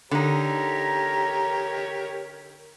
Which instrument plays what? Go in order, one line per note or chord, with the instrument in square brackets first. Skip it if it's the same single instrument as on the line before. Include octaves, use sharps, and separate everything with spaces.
[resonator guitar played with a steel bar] D3 D#4 [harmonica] G4 A#4 C#5 [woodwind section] A#5